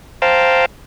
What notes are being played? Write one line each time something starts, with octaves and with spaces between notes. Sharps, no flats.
C5 F5 G5 A5 A#5